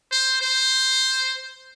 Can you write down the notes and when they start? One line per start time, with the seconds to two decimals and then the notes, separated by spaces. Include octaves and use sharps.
0.12 C5
0.41 C5